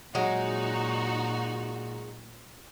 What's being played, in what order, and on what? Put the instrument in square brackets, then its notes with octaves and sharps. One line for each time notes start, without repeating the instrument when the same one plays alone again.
[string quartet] A#2 [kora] F#3 [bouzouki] G#3 [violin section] D#4 F#4